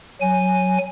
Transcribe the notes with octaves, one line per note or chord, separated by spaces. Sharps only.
F#3 G#5